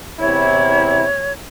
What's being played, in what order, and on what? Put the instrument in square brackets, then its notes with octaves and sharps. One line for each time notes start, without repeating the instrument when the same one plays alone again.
[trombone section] E2 C3 E4 [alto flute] C#5